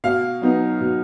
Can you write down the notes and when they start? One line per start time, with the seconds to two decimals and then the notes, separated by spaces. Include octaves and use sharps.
0.04 B2 F5
0.42 F#3 B3 D#4
0.81 B2